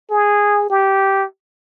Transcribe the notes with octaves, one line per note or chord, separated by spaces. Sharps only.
G#4
G4